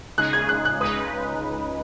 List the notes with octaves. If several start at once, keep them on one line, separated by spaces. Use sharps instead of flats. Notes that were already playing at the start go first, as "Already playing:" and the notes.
C#3 G#3 D#4 G#4 F#6
G#6
F#6
F#6
C#2 C#3 G#3 D#4 B4 D#6